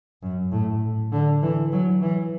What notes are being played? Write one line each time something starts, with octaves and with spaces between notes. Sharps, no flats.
F#2
A2
D3
E3
F#3
E3